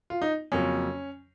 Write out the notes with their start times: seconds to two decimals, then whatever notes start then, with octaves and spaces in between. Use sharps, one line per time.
0.10 F4
0.22 D#4
0.52 F2 C#3 F#3 A#3 C#4